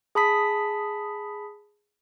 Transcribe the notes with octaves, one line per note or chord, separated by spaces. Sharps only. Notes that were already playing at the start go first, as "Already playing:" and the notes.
G#4 A5 B5 D#6 B6